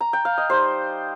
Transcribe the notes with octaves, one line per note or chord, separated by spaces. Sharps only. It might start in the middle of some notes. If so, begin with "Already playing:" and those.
A#5
G5
F5
D#5
G3 D#4 C5